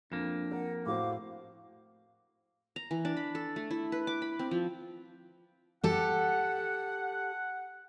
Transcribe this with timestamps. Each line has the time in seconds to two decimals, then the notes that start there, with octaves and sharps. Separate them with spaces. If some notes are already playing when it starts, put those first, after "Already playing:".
0.12 F2 A#3 D4 E7
0.52 A#4 F#5
0.86 A2 F#4 C5 F5 D6
2.76 A#5
2.91 E3
3.05 D4
3.17 B5
3.35 A4
3.56 A3
3.71 E4
3.92 B4
4.07 D6
4.22 B5
4.39 C4
4.51 F3
5.84 G4 A4 F#5